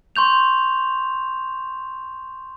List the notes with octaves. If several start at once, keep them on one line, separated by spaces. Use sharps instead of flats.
C6 C#6 G6 F7